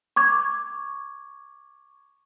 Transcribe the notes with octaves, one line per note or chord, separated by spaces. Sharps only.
C#6 D6 G#6